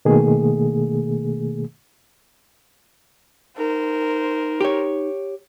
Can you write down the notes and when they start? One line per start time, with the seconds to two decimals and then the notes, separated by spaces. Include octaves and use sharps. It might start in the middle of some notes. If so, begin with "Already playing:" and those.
0.05 B2 D#3 A3 A#3 G#4
3.58 D#4 A#4 C5
4.61 G4 C#5